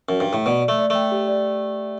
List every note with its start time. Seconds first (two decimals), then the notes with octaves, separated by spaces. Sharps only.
0.09 F#2
0.20 G2
0.33 A2
0.46 B2 D5
0.62 D5
0.68 A3
0.79 D5
0.90 A3 G5
1.12 G4
1.28 D5